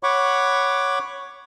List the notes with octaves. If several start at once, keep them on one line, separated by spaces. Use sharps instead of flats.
C#5 F#5 B5 C#6 D6